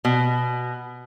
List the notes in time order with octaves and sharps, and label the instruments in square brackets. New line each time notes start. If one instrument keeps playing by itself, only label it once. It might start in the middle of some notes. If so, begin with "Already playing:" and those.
[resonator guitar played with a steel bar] B2